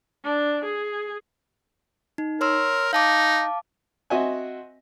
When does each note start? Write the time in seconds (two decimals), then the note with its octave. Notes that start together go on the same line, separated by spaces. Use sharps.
0.24 D4
0.65 G#4
2.18 D#4
2.41 A#4 C#5 C6 E6
2.93 D#4 F5 A5 D6
4.10 C4 F#4 D#5 E5 F#5 G#5